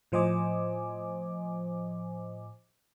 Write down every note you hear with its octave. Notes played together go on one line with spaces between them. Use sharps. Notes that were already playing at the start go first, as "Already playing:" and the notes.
A2 F3 C5 D#5 G#5 D6